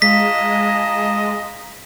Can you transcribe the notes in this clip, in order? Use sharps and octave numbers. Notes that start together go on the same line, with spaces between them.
G#3 F4 D#5 A5 A#5 B6